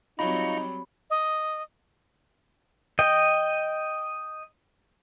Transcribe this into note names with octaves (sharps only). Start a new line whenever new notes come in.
F#3 G3 C4 D#4 F4 A#5 B5 C#6
D#5
D#5 G5